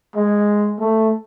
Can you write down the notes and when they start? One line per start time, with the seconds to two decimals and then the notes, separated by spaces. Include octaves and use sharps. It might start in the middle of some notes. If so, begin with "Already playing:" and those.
0.16 G#3
0.79 A3